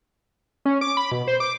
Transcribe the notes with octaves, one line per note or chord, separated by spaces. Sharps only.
C#4
D6
B5
B2
C5
D6